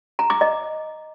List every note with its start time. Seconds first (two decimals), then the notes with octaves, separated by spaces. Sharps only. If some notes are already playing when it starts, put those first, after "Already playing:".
0.19 A#5
0.30 D6
0.41 D#5